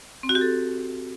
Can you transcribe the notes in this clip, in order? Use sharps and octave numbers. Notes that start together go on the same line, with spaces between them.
C4
F#4
G4
A4